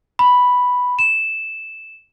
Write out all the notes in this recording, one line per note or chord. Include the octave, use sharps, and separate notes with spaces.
B5
E7